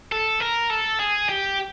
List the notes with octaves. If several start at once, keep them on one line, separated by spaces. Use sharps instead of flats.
A4
A#4
A4
G#4
G4